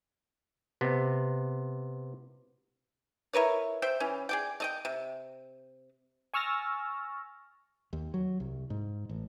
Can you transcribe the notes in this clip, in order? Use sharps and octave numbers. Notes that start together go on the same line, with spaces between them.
C3 B3
E4 A#4 B4 C#5
C5 E5 G5
E3 C#4
G#4 D5 G5
A3 D#5 G5
C3
G#5 C#6 E6 F6 A6 A#6
D#2
F#3
C2
G#2
A1